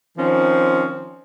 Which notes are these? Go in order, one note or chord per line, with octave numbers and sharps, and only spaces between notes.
D#3 F3 C4 C#4